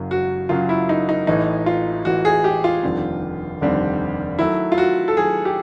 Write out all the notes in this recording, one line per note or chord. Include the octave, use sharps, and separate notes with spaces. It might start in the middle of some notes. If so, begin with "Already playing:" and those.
Already playing: F#1 F#2 C#3 F#3
F#4
F#1 F#2 C#3 F#3 F4
E4
D#4
D#4
A1 A2 E3 D#4
F4
A1 A2 E3 F#4
G#4
G4
F4
F1 D#2 D3 G3 C4
F1 D#2 D3 G3 C4
D#3 F#3 A3 E4
F4
F#4
A4
D#3 F#3 A3 G#4
G4